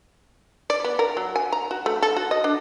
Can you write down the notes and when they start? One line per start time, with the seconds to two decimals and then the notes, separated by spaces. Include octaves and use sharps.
0.70 D5
0.84 B3
0.99 A#4
1.17 F#3
1.36 G#5
1.52 A#5
1.71 F#4
1.86 A3
2.02 A4
2.17 F#4
2.31 D#5
2.44 D4